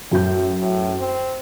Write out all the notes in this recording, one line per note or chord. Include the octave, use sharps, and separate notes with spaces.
F#2 A2 G6
A2
C4